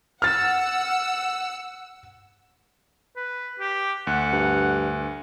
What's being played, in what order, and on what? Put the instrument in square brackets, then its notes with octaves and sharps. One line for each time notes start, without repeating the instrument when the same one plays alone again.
[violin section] F#5 E6 [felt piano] F6 A6
[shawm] B4
G4
[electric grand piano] D2 [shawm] F#5
[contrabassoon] G2